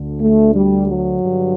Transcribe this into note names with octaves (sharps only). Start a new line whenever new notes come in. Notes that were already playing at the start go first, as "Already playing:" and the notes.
Already playing: D2 D3
A3
G3
F#3
G2 D3